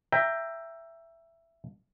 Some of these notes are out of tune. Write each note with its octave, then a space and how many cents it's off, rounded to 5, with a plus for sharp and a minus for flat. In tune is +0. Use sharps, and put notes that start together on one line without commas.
E5 +10 G5 +10 A#5 +0